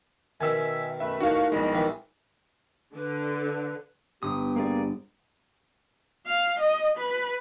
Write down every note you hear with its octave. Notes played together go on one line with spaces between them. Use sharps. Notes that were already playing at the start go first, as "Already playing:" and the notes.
B2 D#3 E5 G#5 E6
F#2 A3 B4 E5
A3 D#4 E4 F#4 A#4 F5
A#1 B2 G3 G#3
D#3 E3 B3
D3 B4
G1 B3 G4 D#6
A#3 G#4 D5
F5
D#5
B4